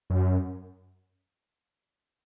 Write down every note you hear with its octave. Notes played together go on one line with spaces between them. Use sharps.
F#2